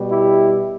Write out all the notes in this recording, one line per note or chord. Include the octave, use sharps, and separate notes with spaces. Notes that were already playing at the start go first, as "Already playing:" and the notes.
Already playing: B2 G3
E4 G4